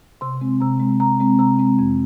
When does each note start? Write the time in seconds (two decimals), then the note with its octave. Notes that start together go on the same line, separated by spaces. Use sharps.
0.21 C3 C6
0.41 G#3 C4
0.60 C3 A#5
0.80 G#3 C4
1.00 C3 A#5
1.20 G#3 C4
1.39 C3 A#5
1.59 G#3 C4
1.79 F2